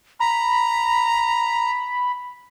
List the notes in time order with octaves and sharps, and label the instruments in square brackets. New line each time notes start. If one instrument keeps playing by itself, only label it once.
[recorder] A#5 [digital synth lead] B5